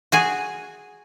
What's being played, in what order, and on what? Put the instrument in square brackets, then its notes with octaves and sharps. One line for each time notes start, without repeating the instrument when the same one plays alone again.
[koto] F#4 G#4 G#5